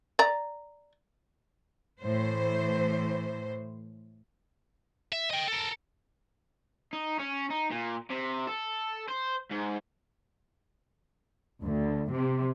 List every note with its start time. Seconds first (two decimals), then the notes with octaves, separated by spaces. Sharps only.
0.19 D5 A#5
2.00 A2 E3 C5
5.12 E5
5.30 D#5 G5
5.48 A4 A#4
6.93 D#4
7.19 C#4
7.51 D#4
7.71 A#2
8.10 C3
8.47 A4
9.08 C5
9.51 G#2
11.63 D2
12.11 C3